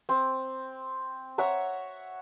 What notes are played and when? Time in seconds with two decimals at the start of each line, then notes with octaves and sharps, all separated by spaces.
0.09 C4
1.38 C#5 E5 F#5 A#5